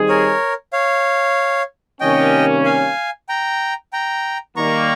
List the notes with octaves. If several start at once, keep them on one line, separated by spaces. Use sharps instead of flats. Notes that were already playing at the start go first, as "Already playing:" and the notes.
Already playing: D#3 G3 C4 D#4 G#4
A#4 C#5
C#5 F5
C3 D#3 G3 A#3 C#4 D#5 G5
F5 G#5
G5 A#5
G5 A#5
D#2 D#3 G3 A#3 A#5 C#6